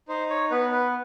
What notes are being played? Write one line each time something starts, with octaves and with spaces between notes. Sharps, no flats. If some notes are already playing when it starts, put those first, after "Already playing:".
D#4 C5
C#5
B3 B4
B4